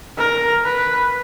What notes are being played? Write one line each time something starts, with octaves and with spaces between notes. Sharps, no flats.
A#4
B4